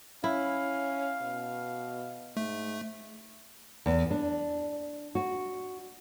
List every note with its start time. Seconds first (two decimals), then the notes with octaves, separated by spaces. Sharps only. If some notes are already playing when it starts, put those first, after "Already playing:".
0.24 C#4 E4 F5
1.22 B2
2.37 G#2 A3
3.86 E2
4.11 D4
5.15 F#4